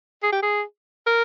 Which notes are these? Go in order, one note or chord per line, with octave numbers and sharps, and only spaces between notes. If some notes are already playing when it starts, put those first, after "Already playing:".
G#4
G4
G#4
A#4